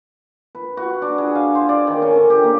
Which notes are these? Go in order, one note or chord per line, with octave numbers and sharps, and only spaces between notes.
B4
F#4
D4
G#4
F5
C5
D5
D#3
C#4
D3
G4
A#3